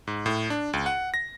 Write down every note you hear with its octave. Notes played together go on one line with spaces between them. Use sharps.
G#2
A2
D4
C#2
F#5
A#6